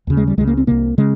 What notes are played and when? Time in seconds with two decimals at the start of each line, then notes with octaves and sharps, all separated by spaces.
0.07 D#2 C#3
0.17 G#3
0.27 G3
0.38 C#2 C#3 G#3
0.47 A#3
0.57 C4
0.67 C2 C3 A#3
0.98 C#3 G#3